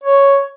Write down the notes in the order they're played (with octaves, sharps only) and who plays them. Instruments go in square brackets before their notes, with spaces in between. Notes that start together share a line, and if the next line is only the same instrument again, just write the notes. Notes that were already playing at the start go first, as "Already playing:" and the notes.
[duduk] C#5